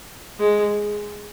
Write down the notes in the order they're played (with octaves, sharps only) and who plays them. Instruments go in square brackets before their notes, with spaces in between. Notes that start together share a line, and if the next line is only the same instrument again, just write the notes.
[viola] G#3